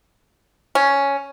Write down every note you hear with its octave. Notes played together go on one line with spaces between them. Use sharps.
C#4